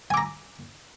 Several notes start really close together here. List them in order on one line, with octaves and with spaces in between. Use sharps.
G#5 D6 A#5